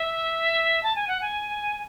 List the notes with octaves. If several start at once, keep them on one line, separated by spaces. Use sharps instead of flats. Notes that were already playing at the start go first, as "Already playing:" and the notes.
Already playing: E5
A5
G#5
F#5
G#5